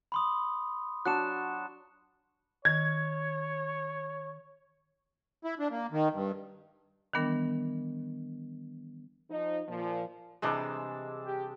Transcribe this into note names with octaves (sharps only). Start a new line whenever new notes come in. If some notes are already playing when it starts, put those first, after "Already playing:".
B5 C6 D#6
F#3 D4 F#6 C#7 E7
D#3 C#5 G#6
E4
D4
A#3
D#3
G2
D#3 E3 G3 B3 D4 A#4
F3 D#4
A#2 F3
C3 E3 G3 G#3 D4 E6
G4